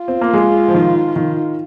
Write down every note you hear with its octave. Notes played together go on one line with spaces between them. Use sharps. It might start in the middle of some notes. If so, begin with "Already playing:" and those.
Already playing: F4
C4
A#3
G#3
F3
D#3
D#3